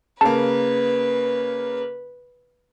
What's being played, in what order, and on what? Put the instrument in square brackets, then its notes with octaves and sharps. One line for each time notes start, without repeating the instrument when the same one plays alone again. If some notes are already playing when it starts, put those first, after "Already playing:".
[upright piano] C#3 A#3 [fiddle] B4 [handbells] A5